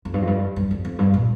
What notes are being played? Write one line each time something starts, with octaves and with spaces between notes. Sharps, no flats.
F2
G2
F2
G2
G2
F2
F2
G2
A#2